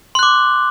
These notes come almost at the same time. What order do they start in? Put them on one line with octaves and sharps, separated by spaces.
C6 F#6 D6